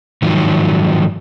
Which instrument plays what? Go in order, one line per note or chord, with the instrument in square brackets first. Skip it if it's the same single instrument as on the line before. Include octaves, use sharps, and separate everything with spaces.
[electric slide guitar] G#2 D#3 F3 F#3